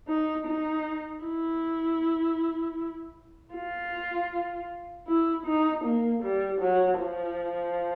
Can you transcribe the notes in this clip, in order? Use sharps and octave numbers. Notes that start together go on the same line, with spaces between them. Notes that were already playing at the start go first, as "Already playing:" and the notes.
D#4
D#4
E4
F4
E4
D#4
A#3
G3
F#3
F3